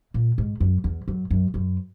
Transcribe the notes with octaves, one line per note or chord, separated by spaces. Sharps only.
A#2
G#2
F#2
E2
F#2
F#2
F#2